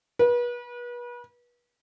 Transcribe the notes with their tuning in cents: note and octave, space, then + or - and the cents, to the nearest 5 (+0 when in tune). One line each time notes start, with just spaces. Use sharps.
B4 -35